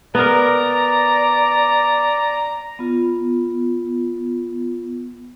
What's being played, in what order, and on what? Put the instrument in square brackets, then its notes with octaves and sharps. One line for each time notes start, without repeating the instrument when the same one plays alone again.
[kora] B3 A#4 [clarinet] D5 [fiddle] A#5
[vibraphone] B3 F4